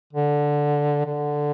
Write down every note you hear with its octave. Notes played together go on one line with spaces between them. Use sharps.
D3
D3